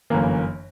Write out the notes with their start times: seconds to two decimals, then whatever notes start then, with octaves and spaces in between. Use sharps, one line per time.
0.10 G1 F#2 E3 A#3